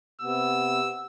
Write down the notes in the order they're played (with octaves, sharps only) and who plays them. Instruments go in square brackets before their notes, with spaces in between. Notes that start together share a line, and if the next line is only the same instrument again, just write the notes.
[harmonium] C3 B3 [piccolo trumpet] E6